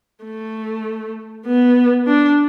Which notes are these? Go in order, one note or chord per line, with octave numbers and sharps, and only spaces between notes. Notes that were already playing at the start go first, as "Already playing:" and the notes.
A3
B3
D4